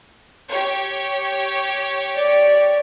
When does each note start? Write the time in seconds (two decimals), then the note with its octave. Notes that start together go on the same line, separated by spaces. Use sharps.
0.50 G4 C#5
2.17 D5